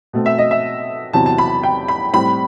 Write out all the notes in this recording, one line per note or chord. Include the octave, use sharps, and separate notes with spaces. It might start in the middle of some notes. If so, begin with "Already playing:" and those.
B2 A3 C4
E5
D#5
E5
E2 C3 F#3 C4 A5
A5
B5
G5
B5
A2 G3 C4 B5